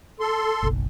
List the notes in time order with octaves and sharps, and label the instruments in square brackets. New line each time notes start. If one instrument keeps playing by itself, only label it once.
[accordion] A4 C6
[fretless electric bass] F#1 B1